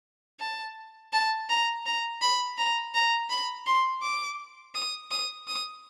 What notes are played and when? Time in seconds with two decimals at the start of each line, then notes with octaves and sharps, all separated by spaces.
0.40 A5
1.13 A5
1.49 A#5
1.86 A#5
2.22 B5
2.58 A#5
2.94 A#5
3.30 B5
3.66 C6
4.03 D6
4.75 D#6
5.11 D#6
5.47 D#6